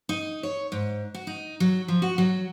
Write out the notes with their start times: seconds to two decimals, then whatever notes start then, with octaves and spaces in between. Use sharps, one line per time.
0.09 D#4
0.43 C#5
0.72 G#2
1.14 F#4
1.27 D#4
1.60 F#3
1.88 F3
2.02 F#4
2.18 F#3